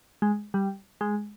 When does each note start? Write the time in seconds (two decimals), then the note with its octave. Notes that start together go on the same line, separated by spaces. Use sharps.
0.22 G#3
0.54 G3
1.01 G#3